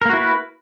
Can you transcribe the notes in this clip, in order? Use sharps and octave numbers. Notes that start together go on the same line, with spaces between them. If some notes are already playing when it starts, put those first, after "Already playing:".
A#3 E4 F#4 A#4 B4